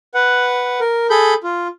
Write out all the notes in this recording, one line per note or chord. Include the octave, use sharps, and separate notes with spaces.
B4 F#5
A#4
G#4 A4 B5 G6
F4